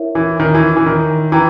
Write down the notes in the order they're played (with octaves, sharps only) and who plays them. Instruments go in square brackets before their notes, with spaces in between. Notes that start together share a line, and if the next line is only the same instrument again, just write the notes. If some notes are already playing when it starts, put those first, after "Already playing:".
Already playing: [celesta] E4 A#4 C#5 E5
[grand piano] E3
D#3
E3
E3
D#3
[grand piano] E3 [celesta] B4 G5 A#5